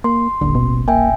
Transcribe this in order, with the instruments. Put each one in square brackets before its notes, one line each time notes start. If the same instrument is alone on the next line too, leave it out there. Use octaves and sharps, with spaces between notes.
[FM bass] A#3 [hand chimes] C6
[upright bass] D#1 A1 [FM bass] D3
[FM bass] B2
[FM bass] A#3 [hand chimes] E5 G5 G#5